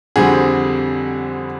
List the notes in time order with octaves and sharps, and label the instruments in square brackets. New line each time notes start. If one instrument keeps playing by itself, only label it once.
[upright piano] F2 D3 G3 C4 F#4 G#4